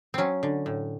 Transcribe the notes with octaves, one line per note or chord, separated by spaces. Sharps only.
F#3 C4 C#4
D3
A2